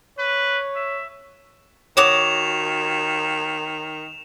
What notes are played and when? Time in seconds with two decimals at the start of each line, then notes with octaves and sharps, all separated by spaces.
0.18 B4 C#5
0.75 E5
1.97 D#3 F#4 C#5 D6 D#6 E7 F7